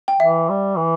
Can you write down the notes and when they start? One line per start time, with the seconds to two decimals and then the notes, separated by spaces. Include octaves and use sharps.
0.08 G5
0.20 E3 E5
0.49 G3
0.77 E3